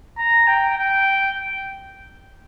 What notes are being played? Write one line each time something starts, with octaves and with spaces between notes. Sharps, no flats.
A#5
G5
G5